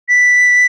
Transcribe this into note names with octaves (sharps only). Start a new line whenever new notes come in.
B6